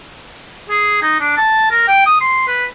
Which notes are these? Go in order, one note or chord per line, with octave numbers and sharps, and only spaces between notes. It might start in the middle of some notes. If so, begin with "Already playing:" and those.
G#4
D#4
D4
A5
A#4
G5
D#6
C6
B4